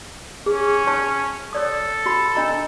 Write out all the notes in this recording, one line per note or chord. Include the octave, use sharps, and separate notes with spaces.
C#4 G#4
C#5 A5 C#6
A4 C#5 D5 D#6
F#4 B5
D4 D#5 A#5